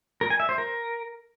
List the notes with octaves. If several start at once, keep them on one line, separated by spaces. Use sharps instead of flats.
A#4
G#5
E5
C5
A#4